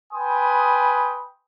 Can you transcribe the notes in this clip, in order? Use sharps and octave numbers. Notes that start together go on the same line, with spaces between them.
B4 G5 G#5 B5 C6 D#6